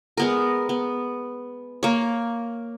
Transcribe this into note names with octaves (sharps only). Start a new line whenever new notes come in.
G#3 B3 A#4
B3
A#3 C#5